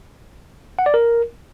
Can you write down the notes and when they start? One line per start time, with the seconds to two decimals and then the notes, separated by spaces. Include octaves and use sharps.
0.79 F#5
0.86 D5
0.94 A#4